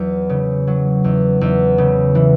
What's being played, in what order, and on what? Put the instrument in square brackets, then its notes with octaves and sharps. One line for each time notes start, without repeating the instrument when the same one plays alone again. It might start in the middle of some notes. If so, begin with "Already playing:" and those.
Already playing: [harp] E2 F#3
C#3
F#3
E2
E2
C#3
E3